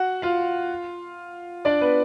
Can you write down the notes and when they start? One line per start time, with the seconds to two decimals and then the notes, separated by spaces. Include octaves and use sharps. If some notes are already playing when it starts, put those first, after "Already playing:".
Already playing: F#4 F#5
0.22 F4 F5
1.65 D4 D5
1.81 B3 B4